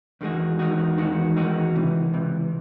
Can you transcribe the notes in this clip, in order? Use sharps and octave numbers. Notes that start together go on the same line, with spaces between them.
E2 D#3 G#3 D#4 F#4
E2 D#3 G#3 D#4 F#4
E2 D#3 G#3 D#4 F#4
E2 D#3 G#3 D#4 F#4
C#2 C3 E3
C#2 C3 E3